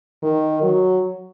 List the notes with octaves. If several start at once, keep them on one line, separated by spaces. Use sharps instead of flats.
D#3
F#3